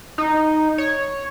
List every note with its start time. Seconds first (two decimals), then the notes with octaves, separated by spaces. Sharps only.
0.18 D#4
0.78 C#5